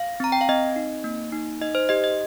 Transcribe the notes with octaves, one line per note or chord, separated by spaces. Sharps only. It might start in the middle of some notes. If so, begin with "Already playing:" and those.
Already playing: F5
C4 A#5
G5
F5
C4 D#5
D#4
A#3
D#4
D#4 D#5
C5
G4 D#5
D#5